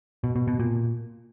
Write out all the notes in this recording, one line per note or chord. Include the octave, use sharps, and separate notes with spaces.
B2
B2
B2
A#2